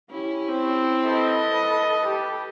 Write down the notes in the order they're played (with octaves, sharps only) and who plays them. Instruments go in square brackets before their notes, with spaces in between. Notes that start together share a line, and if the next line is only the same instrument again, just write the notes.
[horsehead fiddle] C#4 G4 [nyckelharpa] E4
[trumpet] C4
[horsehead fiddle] A4 B4 [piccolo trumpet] D#5
[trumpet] G4